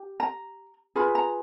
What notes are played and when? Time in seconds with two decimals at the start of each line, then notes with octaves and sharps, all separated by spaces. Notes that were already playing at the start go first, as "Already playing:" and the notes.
Already playing: G4
0.20 A#5
0.96 F4 G#4 B4 B5
1.15 A#5